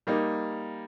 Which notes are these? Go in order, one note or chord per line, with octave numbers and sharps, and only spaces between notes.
G3 A#3 D#4